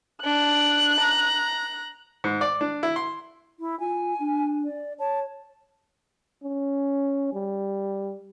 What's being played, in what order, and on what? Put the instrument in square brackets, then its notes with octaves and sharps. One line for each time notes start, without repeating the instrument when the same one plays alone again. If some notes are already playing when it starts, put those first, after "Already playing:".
[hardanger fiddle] D4 [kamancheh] F#6
[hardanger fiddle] A#5
[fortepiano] G#2
D5
D4
E4
C6
[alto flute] E4
[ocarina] F4 [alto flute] G#5
[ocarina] D4
[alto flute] D5
[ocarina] C#5 [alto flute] A5
[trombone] C#4
G3